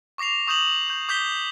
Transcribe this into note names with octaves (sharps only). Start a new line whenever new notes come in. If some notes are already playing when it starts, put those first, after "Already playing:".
C#6 D6 A#6 C7 F7
C#6 D#6 G6 E7 F#7
C#6 G6
D6 G6 B6 G7